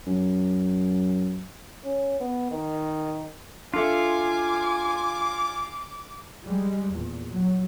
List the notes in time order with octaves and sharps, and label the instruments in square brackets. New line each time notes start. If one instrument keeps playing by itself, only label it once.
[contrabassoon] F#2
[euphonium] C#4
B3
D#3
[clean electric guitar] D4 A4 E5 [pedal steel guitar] F4 [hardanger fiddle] G#5 [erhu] D6
[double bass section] G3 G#3
E2 A#2
F#3